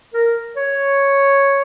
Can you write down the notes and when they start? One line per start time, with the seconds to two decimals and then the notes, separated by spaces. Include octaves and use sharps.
0.14 A#4
0.56 C#5